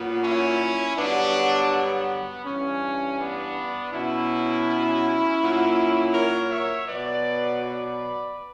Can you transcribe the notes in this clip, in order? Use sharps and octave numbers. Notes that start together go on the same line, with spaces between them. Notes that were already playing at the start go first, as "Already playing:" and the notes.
Already playing: A#2 F#3 B3
C#4 E4
G2 D3 F#3 B3 D4
B3
G2 E3 C#4
B3 D4
B2 F#3 C#4 E4
A#2 F#3
A#4 C#5
C#5 E5
B2 F#3 B4 D5
B4 D5